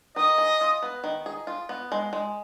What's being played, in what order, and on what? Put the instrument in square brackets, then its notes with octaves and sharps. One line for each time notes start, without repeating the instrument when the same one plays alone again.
[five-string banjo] D#3 [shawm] D#5
[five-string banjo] G#4
F4
B3
D#3
G#4
F4
B3
G#3
G#3